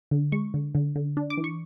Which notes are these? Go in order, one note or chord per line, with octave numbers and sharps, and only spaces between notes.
D3
G#3 C#6
D3
D3
D3
D4
D6
E3
C#6